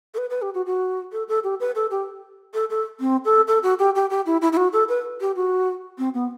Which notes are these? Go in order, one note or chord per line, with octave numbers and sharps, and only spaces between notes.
A4
B4
B4
G4
F#4
F#4
A4
A4
G4
B4
A4
G4
A4
A4
C4
A4
A4
F#4
G4
G4
G4
E4
E4
E4
F#4
A4
B4
G4
F#4
C4
B3